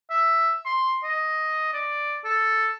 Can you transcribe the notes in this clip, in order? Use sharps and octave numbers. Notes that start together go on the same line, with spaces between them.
E5
C6
D#5
D5
A4